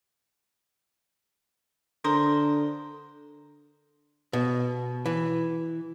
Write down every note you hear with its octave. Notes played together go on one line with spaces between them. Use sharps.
D3 A#4 C5 D#6
B2
E3